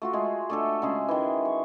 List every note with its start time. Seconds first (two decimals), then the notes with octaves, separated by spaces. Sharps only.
0.02 A3 F4 F#4
0.13 G#3 G#4
0.49 A3 D4 A4
0.82 C#3 G#3 G#4
1.08 D#3 E3
1.45 C#6